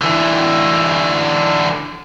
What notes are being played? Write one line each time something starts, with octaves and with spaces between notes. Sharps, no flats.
D3 E3